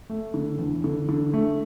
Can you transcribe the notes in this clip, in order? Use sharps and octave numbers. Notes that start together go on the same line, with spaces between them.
A3
D3
E2
D3
D3
A3